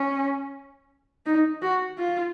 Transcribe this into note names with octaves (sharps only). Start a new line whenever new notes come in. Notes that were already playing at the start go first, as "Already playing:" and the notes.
Already playing: C#4
D#4
F#4
F4